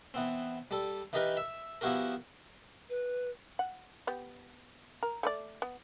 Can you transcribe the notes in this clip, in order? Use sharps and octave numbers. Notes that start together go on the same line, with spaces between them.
E3 B3 C4
G3 A4
E3 D#4 G4 A#4 B4 D#5
E5
F3 B3 E4 F#4 G4 A#4
B4
F#5
B3 G4
A#4
A3 B4 D5
B3